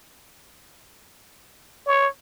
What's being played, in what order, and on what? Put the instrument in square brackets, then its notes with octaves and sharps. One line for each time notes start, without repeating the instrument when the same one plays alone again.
[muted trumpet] C#5